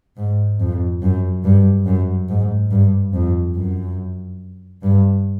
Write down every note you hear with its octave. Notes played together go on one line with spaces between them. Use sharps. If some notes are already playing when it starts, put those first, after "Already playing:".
G#2
F2
F#2
G2
F#2
G#2
G2
F2
F#2
G2